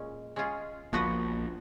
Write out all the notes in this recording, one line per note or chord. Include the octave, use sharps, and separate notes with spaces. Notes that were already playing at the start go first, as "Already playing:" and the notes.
Already playing: A#2 G#3 C#4
G#3 C#4 F4 G#4
A#1 A#2 F3 B3 F#4 B4